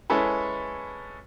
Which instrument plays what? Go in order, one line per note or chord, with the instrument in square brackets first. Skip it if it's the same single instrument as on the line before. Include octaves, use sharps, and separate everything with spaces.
[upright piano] G#3 C#4 E4 A4 B4